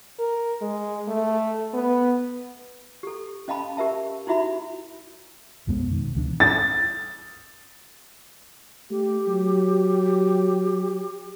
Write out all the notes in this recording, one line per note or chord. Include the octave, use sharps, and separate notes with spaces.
A#4
G#3
A3
B3
G4 A4
C#4 D#5 F5 A5 B5
G4 A#4 E5 A5
D#4 E4 F#4 E5 B5
B1 F2 G#3 B3
B2 D#3
C#2 E3 F#3 D4
A6
A3 G4
F#3